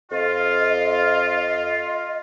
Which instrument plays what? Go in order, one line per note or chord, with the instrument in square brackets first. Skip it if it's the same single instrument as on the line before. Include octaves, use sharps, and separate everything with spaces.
[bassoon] F2 [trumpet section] F4 [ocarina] D#5